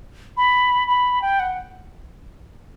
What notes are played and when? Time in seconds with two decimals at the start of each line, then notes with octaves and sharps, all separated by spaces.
0.37 B5
0.88 B5
1.22 G5
1.40 F#5